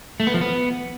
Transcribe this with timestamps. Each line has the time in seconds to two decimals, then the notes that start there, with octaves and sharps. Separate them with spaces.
0.20 A3
0.27 B3
0.34 F3
0.41 B3